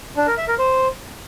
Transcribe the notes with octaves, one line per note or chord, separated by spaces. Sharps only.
D4
A#4
E5
A#4
C5